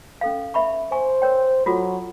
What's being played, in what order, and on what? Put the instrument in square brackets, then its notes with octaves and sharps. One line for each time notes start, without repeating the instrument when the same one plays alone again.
[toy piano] C#4 A4 F5
E5 B5 C#6
[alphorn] C5 [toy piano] G#5 C#6
[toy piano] A#4 C#5 G5
[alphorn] F#3 [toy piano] F4 F#4 A4